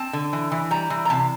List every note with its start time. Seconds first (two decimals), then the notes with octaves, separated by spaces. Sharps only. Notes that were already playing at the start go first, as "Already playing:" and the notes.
Already playing: C4 A5
0.13 D3
0.33 E3
0.52 E3
0.71 G3 A#5
0.90 E3
1.05 A#5
1.10 C3 A5